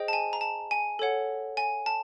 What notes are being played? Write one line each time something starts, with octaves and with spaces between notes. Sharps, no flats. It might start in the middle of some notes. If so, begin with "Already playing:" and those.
Already playing: G#4 C5 D#5 G5
A5
G#5
A#5
A5
G#5
A4 C#5 F#5
G#5
A5